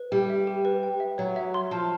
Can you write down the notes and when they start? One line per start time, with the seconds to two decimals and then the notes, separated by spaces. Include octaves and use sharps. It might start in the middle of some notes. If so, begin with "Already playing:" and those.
Already playing: B4
0.12 G3 G5
0.30 E5
0.47 G4
0.65 B4
0.83 G5
1.00 E5
1.18 F#3 C#5
1.36 E5
1.54 C6
1.71 F3 A5